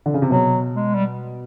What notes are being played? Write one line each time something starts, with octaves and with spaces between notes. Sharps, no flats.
D3
C#3
C3
B2 F#3
G#3
G3